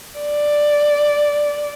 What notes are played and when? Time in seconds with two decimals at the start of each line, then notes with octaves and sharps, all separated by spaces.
0.19 D5